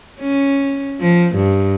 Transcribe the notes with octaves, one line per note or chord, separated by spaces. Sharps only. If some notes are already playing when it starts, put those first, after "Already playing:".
C#4
F3
G2